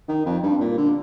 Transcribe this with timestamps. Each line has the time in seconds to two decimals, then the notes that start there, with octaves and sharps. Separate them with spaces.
0.09 D#3
0.26 F2
0.43 G2
0.61 A#2
0.78 D3